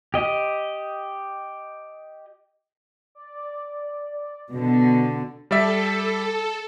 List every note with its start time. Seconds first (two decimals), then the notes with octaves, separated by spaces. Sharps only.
0.14 G4 D#5
3.15 D5
4.51 B2 D3
5.51 G3 A4 D5 E5